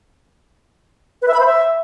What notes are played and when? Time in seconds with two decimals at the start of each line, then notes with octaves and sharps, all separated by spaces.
1.22 B4
1.28 E5
1.34 B5
1.40 C5
1.46 E5